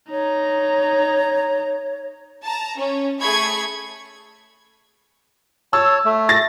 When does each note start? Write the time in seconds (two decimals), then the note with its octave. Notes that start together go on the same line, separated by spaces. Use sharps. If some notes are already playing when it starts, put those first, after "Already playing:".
0.11 D#4 C#5 A#5
2.43 A5 A#5
2.77 C#4
3.20 A3 G#4 B5 C#6 G#6 C#7
5.73 C#5 A5 E6
6.05 A3
6.29 A6 A#6